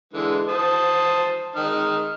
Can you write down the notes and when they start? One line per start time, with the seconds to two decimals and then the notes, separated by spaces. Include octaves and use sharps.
0.13 D3 E3 G#3
0.48 C5 A5 D#6
1.56 G#3 D#4 F6